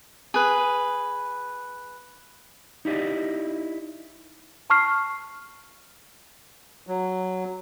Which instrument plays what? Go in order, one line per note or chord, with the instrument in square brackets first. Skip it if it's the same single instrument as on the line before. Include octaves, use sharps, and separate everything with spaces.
[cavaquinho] G#4 B4
[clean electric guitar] D#4 E4 G4 D5 D#5
[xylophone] A5 C#6 F6 C7
[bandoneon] F#3